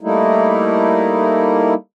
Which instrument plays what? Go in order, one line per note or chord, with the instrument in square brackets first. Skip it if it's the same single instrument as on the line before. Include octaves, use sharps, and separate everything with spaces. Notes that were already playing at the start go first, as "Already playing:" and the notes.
[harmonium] G3 A3 A#3 D#4 E4